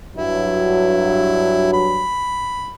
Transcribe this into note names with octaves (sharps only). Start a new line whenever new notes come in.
G2 F#3 E4
B5